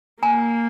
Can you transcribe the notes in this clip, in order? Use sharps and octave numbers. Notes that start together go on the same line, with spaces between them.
A#3 G#5 A#5